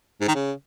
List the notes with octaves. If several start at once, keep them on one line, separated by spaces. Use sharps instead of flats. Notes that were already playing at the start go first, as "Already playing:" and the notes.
G#2
D#3
C#3